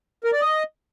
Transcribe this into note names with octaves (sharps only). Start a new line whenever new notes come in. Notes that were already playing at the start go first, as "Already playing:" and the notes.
A#4
D5
D#5